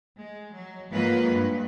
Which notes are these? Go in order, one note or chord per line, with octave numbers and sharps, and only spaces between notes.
G#3
F#3
G#2 F#3 G#3 A#3 F4 B4
G2